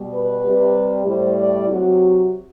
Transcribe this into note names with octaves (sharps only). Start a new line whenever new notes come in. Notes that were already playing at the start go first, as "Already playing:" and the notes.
Already playing: B2 G3
B4
C3 G3
A2 G3 C5
D5
C3 F#3 F#4